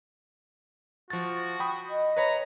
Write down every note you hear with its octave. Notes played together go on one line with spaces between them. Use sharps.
F3 F#4 A6
G5 B5 D#6
D#5
B4 C#5 A#5 B5